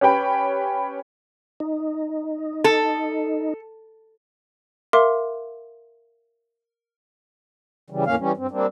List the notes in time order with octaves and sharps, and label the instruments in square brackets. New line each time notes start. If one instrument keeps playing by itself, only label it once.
[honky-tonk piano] C#4 G4 B4 G5 B5
[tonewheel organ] D#4
[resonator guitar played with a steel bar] A4
[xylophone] A#4 E5 F5 C6 D6
[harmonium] C#3 E3 G3
E2 A2 A#3 C#4 F5
E3 G3 C#4
G2 C4
G3 A#3 C4 D4